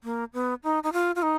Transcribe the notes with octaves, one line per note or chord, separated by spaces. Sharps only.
A#3
B3
D#4
D#4
F4
F4
D#4